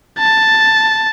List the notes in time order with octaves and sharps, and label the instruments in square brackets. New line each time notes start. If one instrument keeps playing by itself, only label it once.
[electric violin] A5